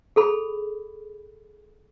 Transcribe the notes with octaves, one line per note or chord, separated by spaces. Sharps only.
G#4 A4 B5